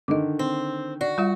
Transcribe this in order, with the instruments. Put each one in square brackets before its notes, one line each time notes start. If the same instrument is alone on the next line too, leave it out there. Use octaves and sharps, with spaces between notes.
[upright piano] D3 D#3 [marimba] D#5 D6
[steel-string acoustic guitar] C4
[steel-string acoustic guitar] F#4 [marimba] D5
[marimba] G3 F4 E5